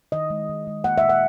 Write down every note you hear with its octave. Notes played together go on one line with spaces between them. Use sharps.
D#3 D#5
G#3
D#3
G#3
A#3 F#5
A#2 E5
F#5